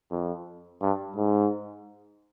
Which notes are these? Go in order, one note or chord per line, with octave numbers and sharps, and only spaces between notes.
F2
G2
G#2